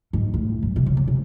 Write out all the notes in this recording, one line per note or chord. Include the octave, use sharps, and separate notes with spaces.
G#2
A2
G2
C3
C#3
C#3
C3